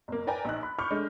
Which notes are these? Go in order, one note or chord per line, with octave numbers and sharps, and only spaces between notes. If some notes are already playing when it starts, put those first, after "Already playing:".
F#1 A#3
A#4 B4 D5 G5 G#5 A#5
A#1 D#4 F#6
B5
B5 C#6 D6 F6 G6
G#3 A3 D4